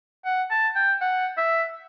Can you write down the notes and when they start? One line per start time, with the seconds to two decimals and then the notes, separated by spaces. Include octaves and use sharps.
0.25 F#5
0.51 A5
0.75 G5
1.01 F#5
1.37 E5